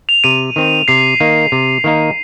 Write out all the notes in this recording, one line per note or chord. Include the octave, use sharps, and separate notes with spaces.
F7
C3 D#7
D#3 C4
C3 C7
D#3 A#3 D#4
C3
D#3 A#3 D#4